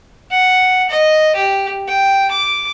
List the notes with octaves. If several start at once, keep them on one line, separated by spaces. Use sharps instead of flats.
F#5
D#5
G4
G5
D6